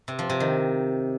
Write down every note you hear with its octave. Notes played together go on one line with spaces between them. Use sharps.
C3
F3
C3
D#3